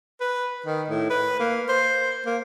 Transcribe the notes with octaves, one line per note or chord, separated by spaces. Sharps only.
B4
D#3
A2
B4
A#3
C5
A#3